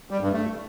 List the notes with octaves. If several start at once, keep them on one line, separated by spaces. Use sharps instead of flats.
G3
G2
A3